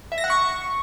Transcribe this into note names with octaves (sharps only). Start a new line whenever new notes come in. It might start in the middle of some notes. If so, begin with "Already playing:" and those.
E5
A#6
F#5
C#6